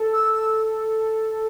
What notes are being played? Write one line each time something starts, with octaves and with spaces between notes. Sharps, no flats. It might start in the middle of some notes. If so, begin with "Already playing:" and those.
Already playing: A4
E6